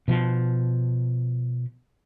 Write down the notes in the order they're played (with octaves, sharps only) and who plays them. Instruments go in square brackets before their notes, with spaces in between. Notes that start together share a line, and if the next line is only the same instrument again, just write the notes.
[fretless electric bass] B2 F3